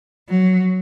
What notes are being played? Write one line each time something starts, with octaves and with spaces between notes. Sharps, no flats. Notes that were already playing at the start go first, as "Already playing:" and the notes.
F#3